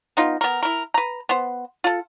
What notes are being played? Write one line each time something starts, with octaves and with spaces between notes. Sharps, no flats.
B3 D#4 F4
B3 A#4
E4 A#4
B4 A#5
B3 C5
F4 A4